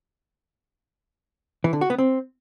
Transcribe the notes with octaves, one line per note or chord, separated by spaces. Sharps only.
E3
D3
F#4
B3
C4